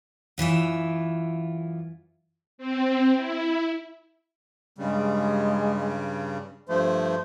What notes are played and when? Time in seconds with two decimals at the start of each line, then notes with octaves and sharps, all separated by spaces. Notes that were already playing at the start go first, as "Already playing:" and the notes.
0.38 F#2 E3 F4 E5
2.58 C4
3.15 E4
4.78 G2 C#3 G3 G#3
6.69 G2 F3 A3 C5